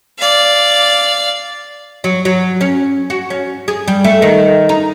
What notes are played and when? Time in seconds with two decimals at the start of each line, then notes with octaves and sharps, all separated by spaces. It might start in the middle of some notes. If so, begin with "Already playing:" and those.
0.18 D5 F5
2.04 F#3
2.25 F#3
2.61 C#4
3.10 F#4
3.30 C#4
3.68 G#4
3.88 G3
4.04 A3
4.22 D#3
4.69 D#4